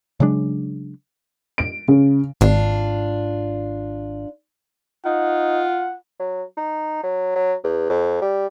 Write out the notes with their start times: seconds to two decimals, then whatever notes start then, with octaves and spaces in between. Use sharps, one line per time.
0.20 C#3 F#3 G#3 D4
1.58 D7
1.88 C#3
2.41 G#1 D4 F4
5.05 D#4 F4 F#5
6.19 F#3
6.57 D#4
7.03 F#3
7.35 F#3
7.64 E2
7.89 F2
8.22 G3